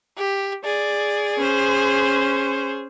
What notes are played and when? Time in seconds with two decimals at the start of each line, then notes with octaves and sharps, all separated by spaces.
0.18 G4
0.64 G#4 D5
1.38 C#4 C5